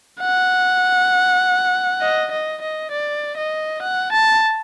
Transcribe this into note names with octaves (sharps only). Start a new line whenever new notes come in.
F#5
D#5
D#5
D#5
D5
D#5
F#5
A5